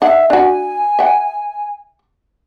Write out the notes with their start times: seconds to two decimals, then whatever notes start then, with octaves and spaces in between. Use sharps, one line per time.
0.02 D#4 E5 F#5
0.30 D4 F#4 G#5
0.99 E5 F#5 G5